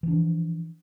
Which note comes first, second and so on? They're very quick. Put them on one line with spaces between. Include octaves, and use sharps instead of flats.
E3 D4 F3